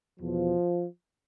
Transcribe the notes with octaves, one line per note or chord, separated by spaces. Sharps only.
E2 B2 F3